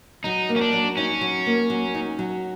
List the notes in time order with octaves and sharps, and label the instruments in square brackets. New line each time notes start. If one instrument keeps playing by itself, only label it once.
[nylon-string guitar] F#3 [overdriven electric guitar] D#4
[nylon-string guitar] A#3
[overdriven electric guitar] C#4
D4
[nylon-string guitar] F#3
[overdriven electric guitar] C#4 [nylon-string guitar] D#4
[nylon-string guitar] F#3
A#3
F#3
D#4
F#3